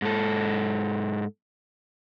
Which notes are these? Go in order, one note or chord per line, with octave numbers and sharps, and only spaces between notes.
G#2 A4